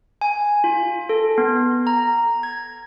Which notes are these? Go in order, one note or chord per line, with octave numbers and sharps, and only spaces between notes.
G#5
F4
A4
B3
A#5
G#6